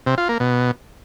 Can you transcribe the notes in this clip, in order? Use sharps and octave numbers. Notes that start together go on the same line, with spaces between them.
C3
F4
A#3
B2